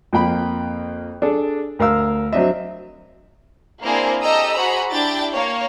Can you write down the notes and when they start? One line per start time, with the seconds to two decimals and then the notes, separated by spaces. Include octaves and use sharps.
0.13 F2 A#3 G5 B5
1.22 D4 G#4 A4
1.79 D2 A#4 F5 E6
2.33 F#3 C4 D4 D#5 E5
3.82 A#3 C4 D4 E4 G#4 A#4
4.22 G4 A4 D#5 A#5 D#6 E6
4.54 F#4 G#4 C5 A#5 B5
4.91 D4 E4 G4 G5 A6
5.33 A#3 C#5